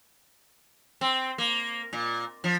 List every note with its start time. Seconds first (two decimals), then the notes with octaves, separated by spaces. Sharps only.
1.01 C4
1.38 A#3
1.93 A#2
2.44 F3